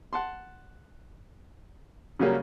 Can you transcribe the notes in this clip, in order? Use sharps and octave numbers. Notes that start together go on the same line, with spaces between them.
F#5 A5 C6
C#3 F#3 G3 A#3 C#4